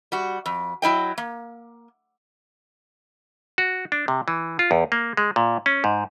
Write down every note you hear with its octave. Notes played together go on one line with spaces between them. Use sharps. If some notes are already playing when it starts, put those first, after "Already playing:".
G3 F#4
F2
F#3 E4 D#5 G5
A#3
F#4
D4
C3
E3
F4
E2
A#3
G#3
A#2
C#4
G#2